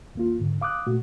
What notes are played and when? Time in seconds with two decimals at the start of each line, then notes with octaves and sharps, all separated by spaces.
0.15 D#2 A#3 F4
0.40 G#2 D3
0.61 F5 D6 D#6 F#6
0.87 A#2 A3 F#4